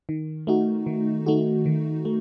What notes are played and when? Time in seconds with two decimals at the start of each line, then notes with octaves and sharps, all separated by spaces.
0.09 D#3
0.47 A3 D#4 F#4
0.86 D#3
1.26 A3 D#4 F#4
1.66 D#3
2.05 A3